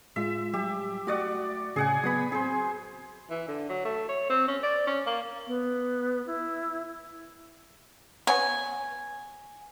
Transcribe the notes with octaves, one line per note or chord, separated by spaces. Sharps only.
A2 G#3 F4 E5
F#3 G3 G4 E5
A3 F#4 D5 F#5 D#6
A2 C#3 G#4 F#5 G#5 D#6
F#3 B3 B5 D#6
C4 G#4 C5
E3
D3
F#3
A3
C#5
C4
C#4
D5
C#4
A#3
B3
E4
B3 C#4 F#4 G#5